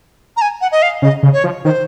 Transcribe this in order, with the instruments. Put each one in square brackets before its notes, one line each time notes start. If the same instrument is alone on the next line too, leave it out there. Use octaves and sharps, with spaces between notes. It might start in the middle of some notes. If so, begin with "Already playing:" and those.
[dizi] A#5
G#5
F#5
D#5
F5
[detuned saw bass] C#3 [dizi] D#5
[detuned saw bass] C#3
[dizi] C#5
[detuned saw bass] F3
[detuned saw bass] D#3 [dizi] C5